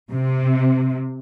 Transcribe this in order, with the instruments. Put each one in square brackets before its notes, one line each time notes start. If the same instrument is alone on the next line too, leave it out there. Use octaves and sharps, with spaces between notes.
[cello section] C3